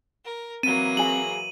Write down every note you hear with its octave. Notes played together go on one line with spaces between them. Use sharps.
A#4
E3 F#3 A#3 C4 D#7
G#4 G#5 F#7